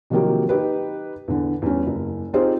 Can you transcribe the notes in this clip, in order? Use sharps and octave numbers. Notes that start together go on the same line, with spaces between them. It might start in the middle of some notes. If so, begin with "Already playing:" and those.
C3 D#3 F3 F#3 A#3 G4
D#4 G4 B4
E2 D3
E2 G3 C#4
F#1
C4 D#4 F4 G4 G#4 C5